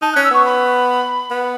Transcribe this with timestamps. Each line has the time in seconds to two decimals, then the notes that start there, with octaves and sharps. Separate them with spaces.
0.02 D#4 A5
0.13 F#6
0.16 C#4
0.24 E6
0.31 B3 C#6
0.45 B5
1.31 B3